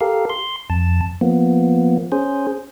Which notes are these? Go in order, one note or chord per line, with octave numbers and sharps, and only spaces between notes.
G4 A4 A#4 F5
C6
F2 A5
F3 A#3 B3
C#4 G#4 C5